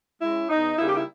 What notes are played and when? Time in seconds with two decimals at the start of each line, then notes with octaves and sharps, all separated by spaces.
0.20 G#3 C#4 E4
0.49 E2 D#4
0.78 C#3 G3 A#3 D#4 E4
0.88 G4
0.96 E4